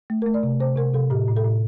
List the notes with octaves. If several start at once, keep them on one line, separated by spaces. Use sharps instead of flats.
A3
A3 A#4
D5
C3
C3 C5
C3 A#4
C3 A4
A2 G4
A2
A4
A2